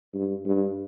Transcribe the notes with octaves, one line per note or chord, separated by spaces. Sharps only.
G2
G2